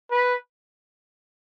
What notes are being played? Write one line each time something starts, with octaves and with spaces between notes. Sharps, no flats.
B4